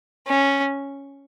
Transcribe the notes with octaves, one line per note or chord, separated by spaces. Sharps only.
C#4